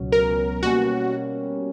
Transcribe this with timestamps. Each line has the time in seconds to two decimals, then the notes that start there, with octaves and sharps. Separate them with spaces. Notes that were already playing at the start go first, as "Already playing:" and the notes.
Already playing: C#2 B2 F#3 C#4
0.12 A#4
0.63 B2 G3 A#3 C#4 F#4